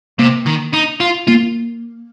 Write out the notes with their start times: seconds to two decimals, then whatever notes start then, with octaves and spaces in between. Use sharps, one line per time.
0.19 C3 A#3
0.46 D#3
0.73 D#4
1.00 F4
1.27 A#3 F4